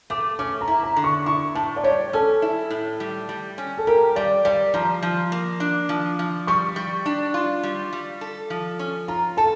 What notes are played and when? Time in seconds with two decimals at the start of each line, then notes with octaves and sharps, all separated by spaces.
0.10 A3 D6
0.39 C#4 D6
0.61 A#5
0.68 E4
0.83 A#5
0.96 D3
1.04 C#6
1.26 E4 C#6
1.55 A2 A5
1.76 D5
1.84 G3 C#5
2.13 C#4 A4
2.42 E4
2.70 A2
3.00 G3
3.29 G3
3.58 C#4
3.78 A4
3.87 G4 A#4
4.16 G3 D5
4.45 G3 D5
4.74 F3 A#5
5.03 F3
5.32 A#3
5.60 D4
5.89 F3
6.19 F3
6.47 G3 C#6
6.76 G3
7.06 D4
7.34 F4
7.63 G3
7.93 G3
8.21 A4
8.50 F3
8.79 C#4
9.08 F4 A#5
9.37 A4 A5